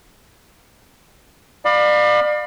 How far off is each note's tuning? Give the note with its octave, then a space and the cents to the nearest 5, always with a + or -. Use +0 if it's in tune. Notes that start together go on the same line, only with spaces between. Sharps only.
D5 +35 F5 +25 B5 +0